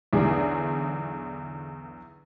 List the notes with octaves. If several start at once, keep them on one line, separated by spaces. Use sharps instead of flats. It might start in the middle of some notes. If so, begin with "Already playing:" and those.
B1 E2 D3 G#4 D5